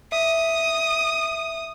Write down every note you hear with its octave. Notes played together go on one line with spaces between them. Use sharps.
E5 D#6